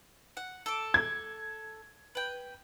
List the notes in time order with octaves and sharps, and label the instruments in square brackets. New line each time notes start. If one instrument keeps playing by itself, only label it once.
[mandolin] F#5
A4 D6
[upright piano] G#6
[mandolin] B4 G5